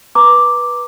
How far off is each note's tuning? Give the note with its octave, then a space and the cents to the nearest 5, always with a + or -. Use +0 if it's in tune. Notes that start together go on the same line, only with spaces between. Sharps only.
B4 -15 A#5 +0 D6 +0